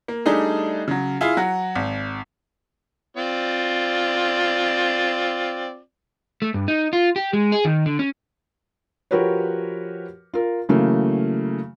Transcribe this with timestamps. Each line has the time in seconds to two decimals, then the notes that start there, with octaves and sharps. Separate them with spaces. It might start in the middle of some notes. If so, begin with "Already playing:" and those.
0.08 A#3
0.26 G3 A3 D4 D#4 G#4
0.88 C#3 F#3
1.21 E4 F4 G#4
1.37 F#3 F#4
1.75 G#1
3.17 C4 F4 D5
6.42 A3
6.54 G2
6.68 D#4
6.93 F4
7.16 G4
7.33 G#3
7.52 G#4
7.65 D#3
7.86 D3
7.99 C#4
9.11 F3 F#4 G4 A#4 B4 C#5
10.34 F4 A#4
10.69 C#3 E3 F#3 A3 A#3